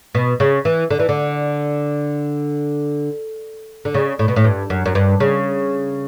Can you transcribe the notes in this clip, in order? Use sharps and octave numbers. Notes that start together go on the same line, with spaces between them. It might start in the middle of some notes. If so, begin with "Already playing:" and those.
B2
C#3
E3
D3
E3
D3
D3
C#3
A2
B2
A2
G2
F#2
F#2
G2
C#3